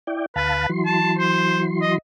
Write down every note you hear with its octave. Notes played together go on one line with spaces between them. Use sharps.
E4 D5 G5
D2 B4 F5 A5
E3 F#3 C6
A5
C5
D#5